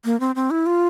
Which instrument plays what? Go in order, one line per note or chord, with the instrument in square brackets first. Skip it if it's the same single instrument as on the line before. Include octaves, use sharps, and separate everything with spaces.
[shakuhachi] A#3
C4
C4
E4
F4